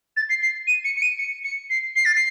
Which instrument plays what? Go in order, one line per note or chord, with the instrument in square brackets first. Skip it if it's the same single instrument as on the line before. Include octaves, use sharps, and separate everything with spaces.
[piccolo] A6
C7
C7
D#7
C#7
C#7
D#7
C#7
C#7
C7
C7
A6
C7